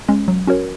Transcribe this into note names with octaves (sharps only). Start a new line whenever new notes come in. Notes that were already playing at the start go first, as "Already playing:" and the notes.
G#3 C#4
F#3
C#4 F#4 A#4 C#5